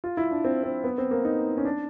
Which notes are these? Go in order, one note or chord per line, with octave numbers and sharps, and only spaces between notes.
F4
E4
D4
C4
C4
B3
C4
A#3
D#4
C#4
D4